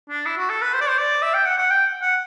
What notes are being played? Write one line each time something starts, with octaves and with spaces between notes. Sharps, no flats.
D4
E4
F#4
A4
B4
C5
D5
C5
D5
E5
G5
F#5
F#5
G5
F#5